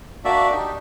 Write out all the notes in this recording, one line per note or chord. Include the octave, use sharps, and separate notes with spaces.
A#3 D4 F#4 D5 E5
D4 D#4 G4